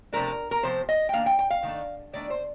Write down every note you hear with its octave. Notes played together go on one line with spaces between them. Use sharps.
C3 F3 A3 D4 A#4
A#4
C3 F3 A3 C5
D#5
G5
D#3 A#3 D4 F5
G5
G5
F5
D#3 A3 D4
D#3 A3 D4 D5
C5